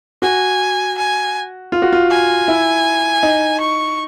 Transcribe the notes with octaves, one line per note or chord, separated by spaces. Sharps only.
F#4 G#5
G#5
F4
F#4
F4
G#5
E4
D#4
C#6